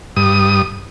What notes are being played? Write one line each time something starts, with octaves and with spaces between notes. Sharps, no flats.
G2 D#6